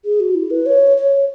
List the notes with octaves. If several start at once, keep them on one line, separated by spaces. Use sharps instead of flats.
G#4
F#4
E4
B4
C#5
C#5